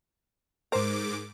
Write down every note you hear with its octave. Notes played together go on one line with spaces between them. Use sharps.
G#2 A#4 C5 D6